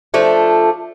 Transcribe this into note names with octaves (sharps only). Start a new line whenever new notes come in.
F3 A3 D4